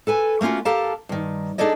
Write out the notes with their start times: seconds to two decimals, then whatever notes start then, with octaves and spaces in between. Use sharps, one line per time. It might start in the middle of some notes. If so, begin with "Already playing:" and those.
0.07 A4 B4 G#5
0.41 A3 A#3 C#4 F4 F#4
0.65 G4 A4 A#4 F5 A5
1.09 G2 D#3
1.58 D4 D#4 G#4 A4 D5 D#5